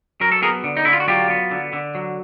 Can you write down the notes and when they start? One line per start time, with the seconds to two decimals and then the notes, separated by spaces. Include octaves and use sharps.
0.21 F#3 A#4
0.32 A4
0.42 B3 G#4 A#4
0.64 D3
0.77 D#4
0.85 D3 E4
0.93 F4
1.00 F#4
1.08 F#3 F4 G4
1.30 B3
1.51 D3
1.73 D3
1.95 F#3